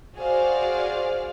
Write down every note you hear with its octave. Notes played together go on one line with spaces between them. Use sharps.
F#4 G#4 C5 D5 F5